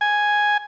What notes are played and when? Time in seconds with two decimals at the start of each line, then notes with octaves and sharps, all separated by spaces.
0.01 G#5